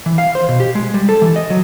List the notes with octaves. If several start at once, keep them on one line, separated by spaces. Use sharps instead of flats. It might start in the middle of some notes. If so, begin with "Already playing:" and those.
E3
F5
C5
B2
G4
G#3
G3
A4
E3
D#5
F#3